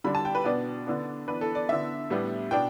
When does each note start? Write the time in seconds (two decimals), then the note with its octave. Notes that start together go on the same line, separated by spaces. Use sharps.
0.04 D3 G3 D4 B5
0.15 A5
0.25 G5
0.35 B4
0.45 B2 B3 D4 D5
0.87 D3 B3 D4
1.28 E3 B3 D4 B4
1.41 A4
1.55 D5
1.69 D3 B3 D4 E5
2.10 A2 G3 B3 D4
2.51 B2 B3 D4 G5